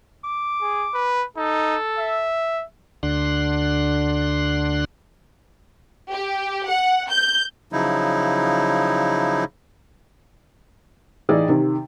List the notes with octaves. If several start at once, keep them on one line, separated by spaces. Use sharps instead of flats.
D6
G#4
B4
D#4 A4
E5
D2 D3 D4 C6 F#6
G4
F#5
G6
C#3 F3 F#3 D#4 E4
A1 E3 D#4 G#4 D5
C3 D#3